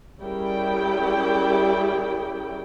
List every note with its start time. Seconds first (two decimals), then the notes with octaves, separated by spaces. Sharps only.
0.21 G3 C#4 E4 G#4 A#4 G5